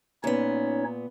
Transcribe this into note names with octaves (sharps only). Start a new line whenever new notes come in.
A#2 B3 C#4 D#4 C#5